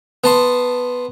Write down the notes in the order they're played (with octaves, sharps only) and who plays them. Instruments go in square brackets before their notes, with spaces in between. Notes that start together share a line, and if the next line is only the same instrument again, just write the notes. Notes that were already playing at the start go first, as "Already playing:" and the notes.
[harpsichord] B3 A5 C6